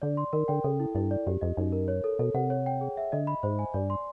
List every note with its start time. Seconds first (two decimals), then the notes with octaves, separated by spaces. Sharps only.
0.02 D3 D5
0.17 C6
0.33 D#3 A#4
0.48 D3 G5
0.64 C#3 A4
0.80 E4
0.95 G2 E4
1.11 D5
1.26 F#2 G4
1.41 F2 D#5
1.57 F#2 D#4
1.72 A#4
1.88 C#5
2.04 A4
2.19 B2 A4
2.34 C3 F#5
2.50 C#5
2.66 G5
2.81 G#4
2.97 E5
3.12 D3 D#5
3.27 B5
3.43 G#2 C5
3.59 G#5
3.74 G2 D5
3.90 C6